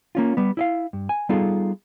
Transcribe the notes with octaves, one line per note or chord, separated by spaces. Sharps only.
A#3 C#4 F4
G3 B3
E4 D#5 F5
G2
G#5
G3 B3 D#4 F4 G#4 A4